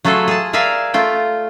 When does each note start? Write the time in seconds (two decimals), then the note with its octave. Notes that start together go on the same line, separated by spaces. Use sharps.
0.05 F#3 A3 F4 G#4 A4
0.28 G#4 A5
0.53 G#4 A#4 D5 E5 F5 G#5
0.94 A3 F4 G5